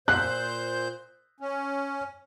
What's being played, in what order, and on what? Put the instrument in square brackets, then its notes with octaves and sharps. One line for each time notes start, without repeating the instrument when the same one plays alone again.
[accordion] A#2 C5 G6 [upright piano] F#6
[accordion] C#4